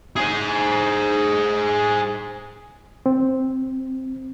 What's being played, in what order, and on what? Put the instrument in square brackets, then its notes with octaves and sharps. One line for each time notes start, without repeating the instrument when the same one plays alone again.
[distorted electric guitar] G#4 C5
[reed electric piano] C4